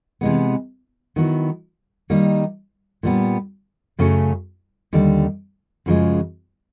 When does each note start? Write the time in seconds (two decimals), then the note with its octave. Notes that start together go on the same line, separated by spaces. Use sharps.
0.21 C3 E3 G#3 B3
1.16 D#3 F#3 B3 E4
2.10 D#3 G3 A#3 D#4
3.03 A#2 G3 B3
3.99 F#2 C#3 F#3 A3 C#4
4.93 D#2 D3 G3
5.86 F#2 C#3 F3 G#3